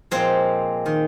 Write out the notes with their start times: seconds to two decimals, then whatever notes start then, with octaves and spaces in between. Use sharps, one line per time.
0.11 A#2 F3 G#3 C4
0.86 D#3